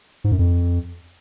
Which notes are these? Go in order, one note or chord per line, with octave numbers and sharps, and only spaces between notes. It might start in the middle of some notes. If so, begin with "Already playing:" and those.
G#2
F#2
F2